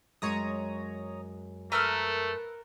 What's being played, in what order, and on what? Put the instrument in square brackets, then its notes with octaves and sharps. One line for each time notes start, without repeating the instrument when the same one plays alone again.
[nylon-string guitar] F#2 G#3 [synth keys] C#5 A#5 D#6
[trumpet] A3 [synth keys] A#4 [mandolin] B4 E6 F6